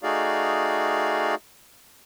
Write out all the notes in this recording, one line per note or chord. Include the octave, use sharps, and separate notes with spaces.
A3 D#4 F#4 G#4 D5 F5